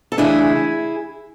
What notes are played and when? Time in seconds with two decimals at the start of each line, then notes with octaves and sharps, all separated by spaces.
0.12 A4
0.18 C#3 E3 A3 D4 E4 G#4